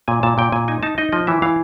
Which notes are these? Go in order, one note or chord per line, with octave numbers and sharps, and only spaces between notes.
A#2 G#5
A#2 A5
A#2 G5
A#2 G#5
D#4 G#5
D#4 A5
D#4 D#5
F3 D#5
E3 E5
E3 F5